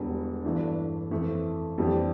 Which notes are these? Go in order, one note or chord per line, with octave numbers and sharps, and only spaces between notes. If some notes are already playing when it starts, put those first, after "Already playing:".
Already playing: E1 E2 D3 G3
G1 G2 E3 A3 D4
F2 E3 A3
F2 E3 G3 D4 G4